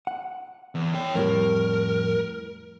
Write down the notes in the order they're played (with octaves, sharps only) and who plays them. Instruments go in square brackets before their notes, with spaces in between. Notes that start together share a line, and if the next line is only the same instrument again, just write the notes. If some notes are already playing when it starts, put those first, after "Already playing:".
[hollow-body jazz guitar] F#5
[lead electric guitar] E2
C#5 G5
[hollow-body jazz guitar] F2 A2 G3 [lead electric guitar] A#4